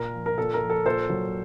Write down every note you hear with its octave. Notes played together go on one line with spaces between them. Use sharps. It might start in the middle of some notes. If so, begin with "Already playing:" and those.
Already playing: A#2 A#4
F3
A#4
A#2 A4
A#4
F3
A4
A#2 A4 C5
F#3